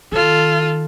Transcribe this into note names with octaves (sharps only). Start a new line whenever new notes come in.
D#3 F4 A4